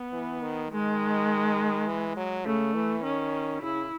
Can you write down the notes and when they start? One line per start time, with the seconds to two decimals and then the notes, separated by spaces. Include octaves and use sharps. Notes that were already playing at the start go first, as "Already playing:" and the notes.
Already playing: B3
0.13 E3
0.42 D#3
0.71 D#3 G#3
1.87 E3
2.16 F#3
2.45 C#3 A3
2.74 E3
3.03 D#3 C#4
3.62 C#3 E4